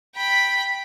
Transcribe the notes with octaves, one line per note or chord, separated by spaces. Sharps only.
G5 B5